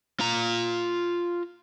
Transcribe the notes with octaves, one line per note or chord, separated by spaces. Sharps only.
F4 A#5